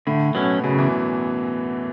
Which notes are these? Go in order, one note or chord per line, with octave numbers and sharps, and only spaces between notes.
A2 D3 A3
B2 F#3 B3 C#4
F#2 C#3 F#3
E2 E3